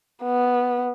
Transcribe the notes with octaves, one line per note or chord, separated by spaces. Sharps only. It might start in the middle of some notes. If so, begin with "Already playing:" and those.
B3